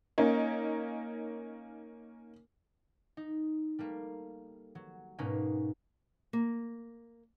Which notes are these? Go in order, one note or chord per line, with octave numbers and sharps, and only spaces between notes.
A#3 C#4 D#4
D#4
G3 A3 A#3
F#3
G#2 B2 G#3 A#3 C#4 D#4
A#3